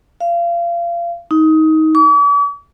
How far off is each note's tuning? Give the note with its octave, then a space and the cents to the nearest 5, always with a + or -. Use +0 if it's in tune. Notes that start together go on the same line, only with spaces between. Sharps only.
F5 -30
D#4 +20
D6 -45